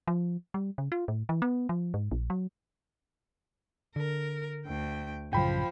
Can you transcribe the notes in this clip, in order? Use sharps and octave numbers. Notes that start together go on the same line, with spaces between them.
F3
G3
C#3
F4
A2
E3
B3
F3
G#2
A#1
F#3
D3 A#4
D2 G5
A1 F#2 C#3 F3 G5 B5